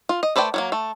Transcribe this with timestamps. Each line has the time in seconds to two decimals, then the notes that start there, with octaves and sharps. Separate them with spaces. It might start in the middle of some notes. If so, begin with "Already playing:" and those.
0.09 F4
0.23 D#5
0.36 A3 B4 C5 D5 G5
0.54 F#3 G3 A#3
0.72 A3